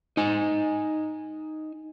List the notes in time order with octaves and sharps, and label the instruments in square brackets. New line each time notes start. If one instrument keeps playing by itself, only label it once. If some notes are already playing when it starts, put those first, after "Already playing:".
[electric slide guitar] D#4 G#5